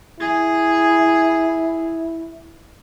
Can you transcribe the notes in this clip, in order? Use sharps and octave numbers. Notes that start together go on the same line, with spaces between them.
E4 G#4